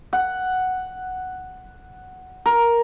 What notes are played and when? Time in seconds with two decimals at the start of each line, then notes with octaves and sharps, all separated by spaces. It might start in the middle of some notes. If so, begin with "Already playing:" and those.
0.13 F#5
2.46 A#4